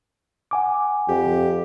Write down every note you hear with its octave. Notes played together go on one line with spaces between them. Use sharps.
F#5 G#5 D6
F2 G4